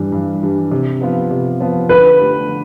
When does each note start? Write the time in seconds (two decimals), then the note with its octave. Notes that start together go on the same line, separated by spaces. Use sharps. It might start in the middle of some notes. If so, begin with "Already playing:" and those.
Already playing: G2 E3 G3 D4
0.12 G2
0.43 E3 G3 D4
0.72 C3
1.01 F3 B3 F4
1.31 C3
1.60 F3 B3 F4
1.89 D3 B4
2.19 A3 D4 G4
2.49 D3